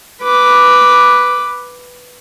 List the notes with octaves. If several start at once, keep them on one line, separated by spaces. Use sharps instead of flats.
B4 D6